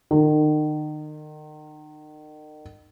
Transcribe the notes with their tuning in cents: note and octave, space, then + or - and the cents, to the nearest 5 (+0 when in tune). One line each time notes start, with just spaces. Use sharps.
D#3 -35